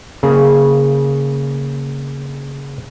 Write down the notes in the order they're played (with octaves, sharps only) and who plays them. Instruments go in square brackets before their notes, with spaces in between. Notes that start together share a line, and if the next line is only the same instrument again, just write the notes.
[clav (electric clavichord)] C#3 A#3 G#4